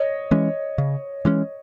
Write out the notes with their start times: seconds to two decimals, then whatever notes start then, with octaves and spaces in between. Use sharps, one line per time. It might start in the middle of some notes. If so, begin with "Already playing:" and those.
Already playing: C#5 D#5
0.31 E3 G#3 C#4
0.78 C#3
1.25 E3 G#3 C#4